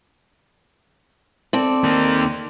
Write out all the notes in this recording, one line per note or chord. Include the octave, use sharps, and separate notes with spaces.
C4 A4 D5
D#3 A#3